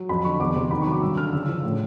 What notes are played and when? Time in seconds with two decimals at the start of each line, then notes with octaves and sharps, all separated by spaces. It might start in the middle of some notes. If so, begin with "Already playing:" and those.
Already playing: F#3
0.09 F2 B5
0.25 D3 C#6
0.40 E2 D6
0.56 C3 C6
0.71 D#3 B5
0.82 C#6
0.87 F#3 D6
1.02 G2 E6
1.17 D3 F6
1.33 C#3 E6
1.43 E6
1.48 F3
1.64 A2